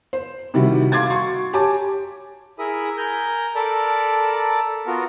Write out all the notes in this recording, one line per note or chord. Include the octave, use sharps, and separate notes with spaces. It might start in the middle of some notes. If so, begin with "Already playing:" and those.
C5
C3 D#3 G3 E4 F#4
F5 C6 D6 G#6 A6
F#4 C6 C#6
G4 C#5 G#5 A5 D6
E4 G#4 A#4 E5 B5 D#6
A#4 G#5 A#5 G6
A4 A#4 D5 A5 B5
B3 F4 F#4 A#4